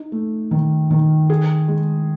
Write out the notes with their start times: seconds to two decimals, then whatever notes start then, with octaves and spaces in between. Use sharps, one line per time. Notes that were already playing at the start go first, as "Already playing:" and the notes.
Already playing: D#4
0.12 A3
0.51 D#3
0.90 D#3
1.30 G#4
1.68 G#3